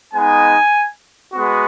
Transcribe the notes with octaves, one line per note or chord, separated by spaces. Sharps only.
G#3 B3 D#4 G#5
G#3 B3 F#4